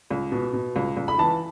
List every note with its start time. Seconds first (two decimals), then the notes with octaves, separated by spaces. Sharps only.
0.10 C#2
0.32 B2
0.53 B2
0.76 C#2
0.97 C#2
1.08 B5
1.18 E3 A5